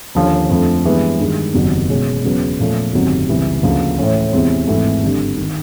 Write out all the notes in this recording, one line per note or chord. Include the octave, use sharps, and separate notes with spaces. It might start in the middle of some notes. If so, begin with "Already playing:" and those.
D#2 D3 F3 A#3 C#4
F2 D3 F3 A3
G2 E3 G#3 B3
G2 D#3 G#3
F#1 E2 C3 D#3 F#3
E1 E2 B2 G#3 C#4
E2 C#3 F#3 B3
A#2 F3 A3 C#4
G1 F2 C3 D#3 F#3
C#2 C3 E3 G3 B3
D2 C#3 F3 A#3
A2 E3 A3 C#4
E2 C3 E3 G#3 C4
G#1 G#2 E3 A3
G#1 G2 D3
D#3